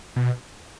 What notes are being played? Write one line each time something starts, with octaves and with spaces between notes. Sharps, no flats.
B2